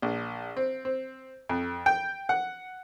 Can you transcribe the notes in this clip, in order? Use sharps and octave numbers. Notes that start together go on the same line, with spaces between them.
A#1
C4
C4
F2
G5
F#5